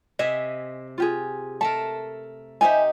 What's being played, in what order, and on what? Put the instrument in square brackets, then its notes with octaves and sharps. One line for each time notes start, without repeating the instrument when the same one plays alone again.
[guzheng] C3 E5 G#5 [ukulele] D#5
[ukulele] F4 G4 G#4
[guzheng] A3 A4 A#4 [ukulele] A5
[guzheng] D#4 G4 [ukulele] C5 E5 G#5